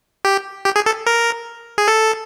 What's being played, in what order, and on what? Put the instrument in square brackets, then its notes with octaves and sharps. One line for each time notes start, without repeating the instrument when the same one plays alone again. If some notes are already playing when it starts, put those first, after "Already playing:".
[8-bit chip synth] G4
G4
G#4
A4
A#4
G#4
A4